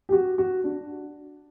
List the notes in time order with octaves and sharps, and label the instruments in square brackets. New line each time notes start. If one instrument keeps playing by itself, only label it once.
[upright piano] G4
F#4
F#4
D4